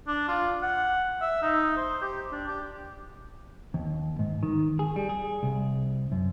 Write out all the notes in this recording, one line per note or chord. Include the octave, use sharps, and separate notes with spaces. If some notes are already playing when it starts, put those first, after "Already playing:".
D4
F4
F#5
E5
D#4
C5
G4
D4
G4
D#2
G#2
D#3
G#4
G3
G#4
C2
F#2